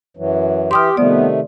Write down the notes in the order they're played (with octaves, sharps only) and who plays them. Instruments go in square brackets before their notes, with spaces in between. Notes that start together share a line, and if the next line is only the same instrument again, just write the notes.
[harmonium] F#2 E3 F#3
[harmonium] E3 [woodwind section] G4 [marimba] C6 D#6 F6
[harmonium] C3 D#3 A3 [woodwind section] F3 G3 B3 [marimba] D5